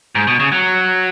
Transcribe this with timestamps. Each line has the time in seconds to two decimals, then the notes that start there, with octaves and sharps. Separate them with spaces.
0.15 G#2
0.27 B2
0.40 C#3
0.52 F#3